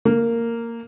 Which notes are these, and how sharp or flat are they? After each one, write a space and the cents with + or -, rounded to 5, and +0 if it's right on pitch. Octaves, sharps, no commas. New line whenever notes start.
A#3 -10